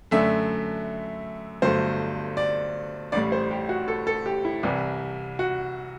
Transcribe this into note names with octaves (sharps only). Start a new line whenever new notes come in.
F#2 D3 A3 E5
G1 G2 F#3 A3 C5
D5
A1 A2 G3 D5
C5
G4
F#4
A4
A4
G4
E4
C2 C3 E3 G3
F#4